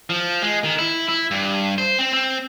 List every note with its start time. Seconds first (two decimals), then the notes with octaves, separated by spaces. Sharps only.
0.10 F3
0.42 G#3
0.64 D#3
0.79 E4
1.09 E4
1.31 G2
1.78 C5
1.99 C4
2.13 C4